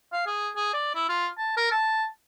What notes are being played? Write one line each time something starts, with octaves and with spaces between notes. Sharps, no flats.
F5
G#4
G#4
D5
E4
F4
A5
A#4
A5